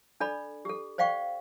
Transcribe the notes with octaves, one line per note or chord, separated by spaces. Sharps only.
D4 A4 D5 B5
G4 A4
C5 D5 F5 G5 C#6